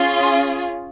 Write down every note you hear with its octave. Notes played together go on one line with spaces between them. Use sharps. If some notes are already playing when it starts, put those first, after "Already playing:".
Already playing: C#4 F4 G#4 C6